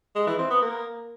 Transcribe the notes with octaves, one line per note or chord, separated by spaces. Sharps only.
G#3
E3
C4
B3
A#3